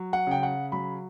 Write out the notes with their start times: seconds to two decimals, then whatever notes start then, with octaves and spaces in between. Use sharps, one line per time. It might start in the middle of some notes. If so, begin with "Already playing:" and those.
Already playing: F#3
0.13 F#5
0.27 C#3 G5
0.43 F#5
0.72 F#3 B5